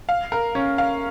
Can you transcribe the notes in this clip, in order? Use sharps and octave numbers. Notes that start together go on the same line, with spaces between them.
F5
A#4
C#4
F5